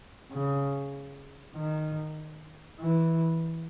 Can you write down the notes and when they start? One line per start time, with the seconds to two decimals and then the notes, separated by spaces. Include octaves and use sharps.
0.32 C#3
1.56 D#3
2.80 E3